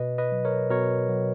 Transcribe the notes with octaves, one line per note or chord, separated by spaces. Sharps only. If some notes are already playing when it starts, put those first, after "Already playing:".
Already playing: B2 B4 D#5
B4 D#5
F#3
A#4 C#5
B2 A#4 C#5
F#3